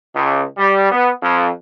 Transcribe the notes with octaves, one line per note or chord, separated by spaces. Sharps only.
C#2
G3
B3
F2